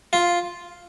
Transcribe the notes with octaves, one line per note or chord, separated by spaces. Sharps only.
F4